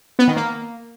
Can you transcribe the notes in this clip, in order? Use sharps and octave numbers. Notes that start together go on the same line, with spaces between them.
B3
D#3
A#3